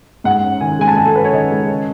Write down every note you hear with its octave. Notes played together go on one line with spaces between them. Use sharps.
G#2 F#5
C#4
D#3 G#5
G#3 G#5
A5
G#2 G#5
A4
C#4 B4
C#5
D#3 D#5
G#3
C#3